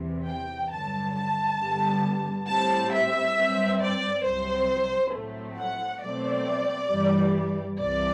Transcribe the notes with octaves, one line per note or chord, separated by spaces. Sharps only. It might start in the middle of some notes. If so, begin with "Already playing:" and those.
Already playing: E2 C3 E3
G5
G2 D3 F#3 A5
A5
G2 D3 G3 B3
A2 G3 C4 A5
E5
G2 F#3 C4
D5
C2 C3 F#3 C4 C5
A2 F#3 A3 C4
F#5
B2 F#3 A3 C4 D5
G2 E3 G3
C2 C3 E3 D5